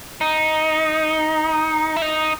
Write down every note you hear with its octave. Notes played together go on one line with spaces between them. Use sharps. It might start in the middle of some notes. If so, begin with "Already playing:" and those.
D#4
E4
D#4